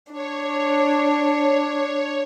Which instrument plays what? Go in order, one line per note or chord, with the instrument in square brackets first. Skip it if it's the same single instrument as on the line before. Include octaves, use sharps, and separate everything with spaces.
[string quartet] D4 [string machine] C#5